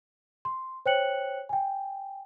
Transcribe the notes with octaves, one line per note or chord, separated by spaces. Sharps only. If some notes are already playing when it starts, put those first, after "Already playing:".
C6
C5 C#5 G5 F#6 C#7 F#7
G5 G#5